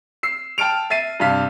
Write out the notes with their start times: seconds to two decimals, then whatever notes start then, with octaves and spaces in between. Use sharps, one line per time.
0.23 E6 C7
0.58 G5 A5 F6 D7 F7
0.90 E5 A6 C7 D#7
1.20 G2 C3 F5 B6